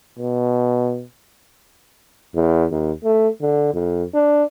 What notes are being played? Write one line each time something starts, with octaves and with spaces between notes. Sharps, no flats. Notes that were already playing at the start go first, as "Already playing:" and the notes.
B2
E2
D#2
A3
D3
F2
D4